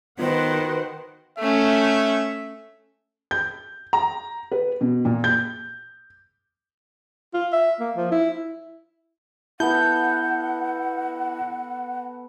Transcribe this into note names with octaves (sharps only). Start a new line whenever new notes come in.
D#3 B3 F4 F#4 B4 C5 F#5
A3 C#4 E5
G6
A#5
B4
B2
A#2
G6
F4
E5
A#3
F3
E4
B3 E4 A4 F#5 G6